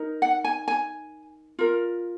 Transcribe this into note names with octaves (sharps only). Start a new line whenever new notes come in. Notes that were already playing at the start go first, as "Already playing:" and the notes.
Already playing: D#4 A#4
F#5
G#5
G#5
F4 A#4